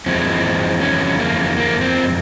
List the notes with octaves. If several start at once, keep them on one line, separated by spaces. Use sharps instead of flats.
F2 E3 G#3 C4
C#4
A#3
A#3
C4